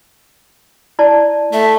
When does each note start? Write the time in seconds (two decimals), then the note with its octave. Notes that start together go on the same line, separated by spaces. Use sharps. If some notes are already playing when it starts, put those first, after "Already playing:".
0.99 E4 D5 A5
1.53 A3 E5